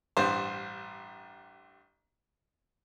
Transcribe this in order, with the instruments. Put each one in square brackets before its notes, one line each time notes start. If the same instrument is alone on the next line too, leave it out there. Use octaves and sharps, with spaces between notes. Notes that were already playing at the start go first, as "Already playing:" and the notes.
[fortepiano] A1 G2 C5